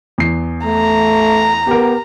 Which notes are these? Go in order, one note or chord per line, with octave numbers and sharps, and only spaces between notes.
E2 C7
A3 A#5
B3 G4 A#4